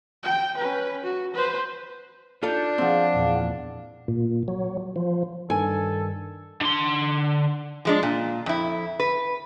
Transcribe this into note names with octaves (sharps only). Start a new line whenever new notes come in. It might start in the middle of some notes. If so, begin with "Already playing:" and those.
G5
C#4 B4
F#4
B4 C5
D4 D#4 F4 A4 F5 G6
F3 C4 G#4 F5 F#5
E2 A#2
A#2
F#3
F3
G2 D#3 A4 G#5
D3 C6
F3 G#3 D4
A#2
F2 E4
B4